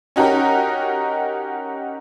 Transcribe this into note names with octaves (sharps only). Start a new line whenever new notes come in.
C#4 D#4 F#4 G4 A#4